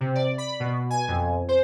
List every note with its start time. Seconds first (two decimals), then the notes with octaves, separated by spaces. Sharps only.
0.01 C3
0.15 D5
0.38 B5
0.60 B2
0.90 G#5
1.08 F2
1.48 C5